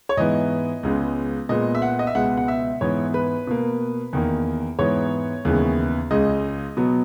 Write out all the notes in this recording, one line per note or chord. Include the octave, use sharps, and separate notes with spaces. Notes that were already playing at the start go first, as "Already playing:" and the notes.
C#5
G#2 E3 B3 D#5
C#2 C#3 G#3 B3
A#2 G#3 B3 D#5
E5
F#5
D#5
E5
C#2 B2 G#3 B3 F#5
F#5
E5
G#2 E3 B3 C#5
B4
B2 A#3
E2 D#3 A#3
G#2 E3 B3 C#5
D#2 C#3 E3 G#3 B3
C#2 C#3 G#3 D#5
B2 F#3 B3